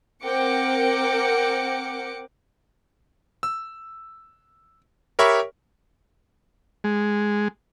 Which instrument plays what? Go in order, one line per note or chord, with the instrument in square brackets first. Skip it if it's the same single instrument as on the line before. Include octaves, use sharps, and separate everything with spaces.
[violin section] C4 A#4 F#5 G5 D6 C#7
[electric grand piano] E6
G4 A#4 C#5 E5 B5 C#6
[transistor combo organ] G#3